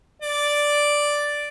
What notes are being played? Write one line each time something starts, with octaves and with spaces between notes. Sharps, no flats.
D5